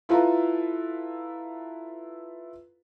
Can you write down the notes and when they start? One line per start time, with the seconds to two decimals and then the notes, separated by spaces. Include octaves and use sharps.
0.09 E4 F4 A4 B4 F5 A#5